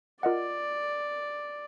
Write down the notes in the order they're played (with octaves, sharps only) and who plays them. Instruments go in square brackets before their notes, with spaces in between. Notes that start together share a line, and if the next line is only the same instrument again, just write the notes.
[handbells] F4 A#4 D#5 F#5 [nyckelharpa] D5